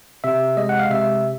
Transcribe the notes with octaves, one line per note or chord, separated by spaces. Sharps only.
C3 E5
G#3 D#5
F#5
F5
C3 E5